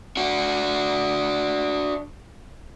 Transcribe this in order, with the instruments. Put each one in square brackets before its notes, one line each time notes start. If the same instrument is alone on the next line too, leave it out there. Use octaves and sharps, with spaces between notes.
[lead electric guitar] D4 F#4